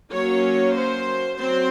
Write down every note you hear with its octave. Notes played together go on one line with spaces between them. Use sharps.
F#3 A#3 C#4 C#5
C5
F#3 C4 C5